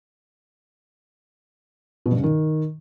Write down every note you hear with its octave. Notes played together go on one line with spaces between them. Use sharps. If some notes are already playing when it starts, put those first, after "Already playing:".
B2
G2
C#3
D#3